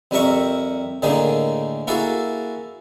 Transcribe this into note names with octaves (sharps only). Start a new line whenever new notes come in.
F2 G3 C4 A#4 E5 C#6
A2 D3 D#3 A#3 D#4 G#4
A#3 E4 F#4 G#4 A4